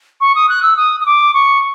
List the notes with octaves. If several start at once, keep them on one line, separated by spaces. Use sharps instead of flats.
C#6
D#6
F#6
E6
D#6
D#6
D6
C#6